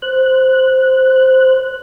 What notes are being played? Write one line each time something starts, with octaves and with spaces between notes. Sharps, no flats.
C5 F#6